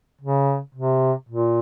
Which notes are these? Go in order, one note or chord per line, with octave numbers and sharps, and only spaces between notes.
C#3
C3
A#2